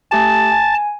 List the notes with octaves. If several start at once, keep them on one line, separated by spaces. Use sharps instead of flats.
A3 G4 G#5 A5
G#5